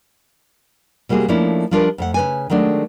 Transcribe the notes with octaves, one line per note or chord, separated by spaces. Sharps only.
C3 G3 A#3 F#4 G#4
F3 A3 A#3 C#4 D4 E4
F3 G3 D4 F4 A#4 B4
F2 A3 F#5
C#3 B4 G#5
D#3 F#3 G#3 A3 D4